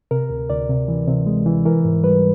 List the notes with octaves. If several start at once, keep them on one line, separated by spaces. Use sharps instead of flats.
C3 A#4
D2
D2 D5
C3
E3
C3
G#3
E3
E3 A#4
G#2
G3 B4